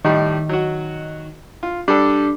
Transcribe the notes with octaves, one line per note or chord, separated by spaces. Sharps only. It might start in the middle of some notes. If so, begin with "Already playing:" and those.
A2 D#3 G3
F#3 F#4
F4
G3 D4 A4